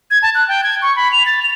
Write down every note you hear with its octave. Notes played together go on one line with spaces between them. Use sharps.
G#6
A5
F#6
G5
G#6
C#6
B5
F7
A6
F7